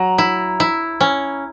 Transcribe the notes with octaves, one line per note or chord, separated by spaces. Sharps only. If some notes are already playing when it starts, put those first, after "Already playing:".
Already playing: F#3 A#5
E4
E4
C#4